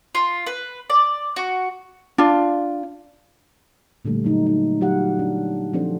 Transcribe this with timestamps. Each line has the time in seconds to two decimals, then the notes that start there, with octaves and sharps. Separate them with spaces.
0.15 F4
0.46 B4
0.90 D5
1.36 F#4
2.18 D4 F4
4.05 A#2 D3 G3 A3
4.24 F#3 A3 D#4
4.47 D#4
4.81 F#3 F4 G4 F5 F#5
5.19 D4
5.73 F3 C4 D4 A4 C5